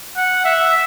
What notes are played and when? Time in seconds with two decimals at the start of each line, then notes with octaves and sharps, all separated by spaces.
0.17 F#5
0.45 E5